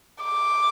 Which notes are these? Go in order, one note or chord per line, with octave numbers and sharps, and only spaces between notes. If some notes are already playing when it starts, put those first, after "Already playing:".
D6